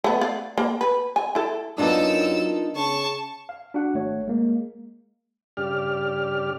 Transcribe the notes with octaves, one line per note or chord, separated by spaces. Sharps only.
A3 B3
D5 F5
A#3
B4
G#5
E4 A4
F#2 B3 D4 D#4 F4 A4 A#4 E6
C#3 A5 C#6
F5
D4 F#4 F#5
G#1 A3 C#5
G#3 A#3
G2 C#3 G4 D5 F6